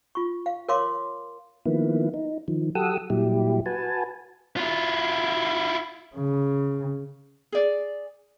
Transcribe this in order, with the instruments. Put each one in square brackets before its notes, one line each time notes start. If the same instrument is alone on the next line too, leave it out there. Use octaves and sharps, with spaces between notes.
[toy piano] F4 C#6
F5
A#4 C#5 F5 C6 D6
[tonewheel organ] D#3 F3 A#3 B3 E4
D#4
D#3 F3
F#3 G4 A4 F#5 D#6 E6
A#2 F#3 G3 E4 G4
F#4 B4 G#5 A5
[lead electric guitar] E4 F4
[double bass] C#3
[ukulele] G#4 D5